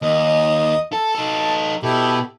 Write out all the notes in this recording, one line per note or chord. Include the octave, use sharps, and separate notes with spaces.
D#2 D#5
A4 A5
D#4 A4
B2 E4 G4 A4